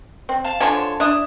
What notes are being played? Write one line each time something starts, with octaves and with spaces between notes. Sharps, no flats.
C4
F5 A5
D3 F3 C#5 G#5 A5 C6
D4 E4 D#6